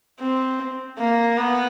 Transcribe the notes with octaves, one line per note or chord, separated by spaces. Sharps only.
C4
A#3
B3